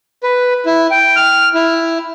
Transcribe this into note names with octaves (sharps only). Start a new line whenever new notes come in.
B4
E4
G5
F6
E4